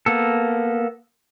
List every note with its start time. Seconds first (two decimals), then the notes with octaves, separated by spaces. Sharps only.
0.06 A#3 B3 A4